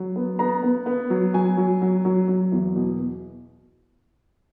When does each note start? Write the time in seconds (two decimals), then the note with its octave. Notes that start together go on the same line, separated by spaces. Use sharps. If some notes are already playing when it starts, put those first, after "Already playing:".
Already playing: F#3
0.16 B3
0.39 B3 A#5
0.63 B3
0.86 B3
1.10 F#3
1.34 F#3 G#5
1.57 F#3
1.82 F#3
2.05 F#3
2.28 F#3
2.52 E2
2.75 B2